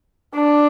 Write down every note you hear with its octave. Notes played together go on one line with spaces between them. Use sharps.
D4